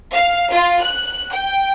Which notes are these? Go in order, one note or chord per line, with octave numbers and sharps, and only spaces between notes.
F5
F4
F#6
G5